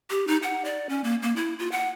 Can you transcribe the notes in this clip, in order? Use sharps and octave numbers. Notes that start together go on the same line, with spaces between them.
G4
D#4
F#5
D5
C#4
A#3
A#3
E4
F4
F#5